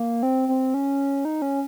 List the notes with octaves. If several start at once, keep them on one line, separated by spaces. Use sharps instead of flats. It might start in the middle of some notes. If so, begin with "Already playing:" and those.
Already playing: A#3
C4
C4
C#4
D#4
C#4